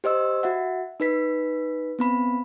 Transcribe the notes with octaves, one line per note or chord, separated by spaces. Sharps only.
G4 C5 D#5 E6
F#4 E5 F#5
D#4 B4 B6
B3 C4 B5